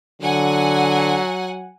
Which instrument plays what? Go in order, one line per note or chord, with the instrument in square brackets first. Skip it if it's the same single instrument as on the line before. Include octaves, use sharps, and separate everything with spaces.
[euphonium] D3 [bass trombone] F#3 [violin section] F#5 G#5